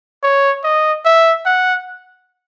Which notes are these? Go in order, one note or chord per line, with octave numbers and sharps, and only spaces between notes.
C#5
D#5
E5
F#5